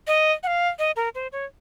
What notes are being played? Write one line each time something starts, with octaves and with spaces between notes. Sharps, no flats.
D#5
F#5
F5
D#5
A#4
C5
C#5